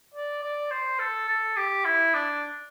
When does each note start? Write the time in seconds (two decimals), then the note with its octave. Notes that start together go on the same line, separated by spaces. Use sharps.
0.14 D5
0.43 D5
0.71 C5
0.99 A4
1.28 A4
1.56 G4
1.85 E4
2.14 D4